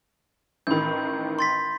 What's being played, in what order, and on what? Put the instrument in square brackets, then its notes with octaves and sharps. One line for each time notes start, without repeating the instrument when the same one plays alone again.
[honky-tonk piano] A1 D#3 [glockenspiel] B5 G6
[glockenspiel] C6 A6 B6